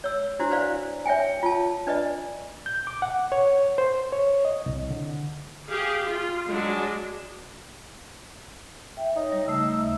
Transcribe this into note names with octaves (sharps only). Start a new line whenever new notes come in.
C#5 E6
D4 E4 F#4 C5
B4 C5 D5 F5
C#5 E5 G5 G#5
F4 A5
D4 B4 D5 D#5
G6
D6
F#5
C#5
C5
C#5
D#5
C2
D3
G4 G#4 F5
F4
F#3 G#3 D4
E5 G5
D#4 C#5
G3
C#3 A3 D#4 E6
D#2 C#3 E5